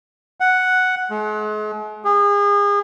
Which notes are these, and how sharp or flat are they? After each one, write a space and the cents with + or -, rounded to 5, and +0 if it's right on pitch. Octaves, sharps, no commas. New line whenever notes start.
F#5 +0
G#3 +40
G#4 -35